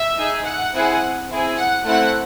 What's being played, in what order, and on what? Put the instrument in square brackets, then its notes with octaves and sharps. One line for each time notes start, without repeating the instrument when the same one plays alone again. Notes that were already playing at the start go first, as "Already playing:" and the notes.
Already playing: [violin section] E5
D#4 G#4
F#5
C4 E4 G#4
C4 E4 G#4
F#5
A3 C4 E4 F#5